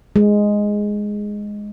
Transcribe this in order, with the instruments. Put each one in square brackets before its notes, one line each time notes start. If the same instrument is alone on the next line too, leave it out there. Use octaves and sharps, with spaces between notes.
[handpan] G#3